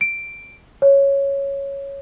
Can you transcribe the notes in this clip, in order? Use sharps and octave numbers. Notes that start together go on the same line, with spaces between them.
D7
C#5